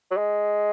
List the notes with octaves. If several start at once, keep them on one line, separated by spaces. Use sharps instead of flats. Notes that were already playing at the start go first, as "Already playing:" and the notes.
F#3
G#3